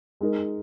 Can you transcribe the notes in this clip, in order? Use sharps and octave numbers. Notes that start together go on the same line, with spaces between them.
G#3 D#4 A#4